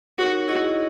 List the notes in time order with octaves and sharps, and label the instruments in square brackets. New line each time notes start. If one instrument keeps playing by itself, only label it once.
[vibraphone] D#4 A#4 C#5 [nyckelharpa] F#4
[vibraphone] E4 G#4 D#5 [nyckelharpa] F#4